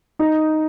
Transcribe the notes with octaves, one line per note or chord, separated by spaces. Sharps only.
D#4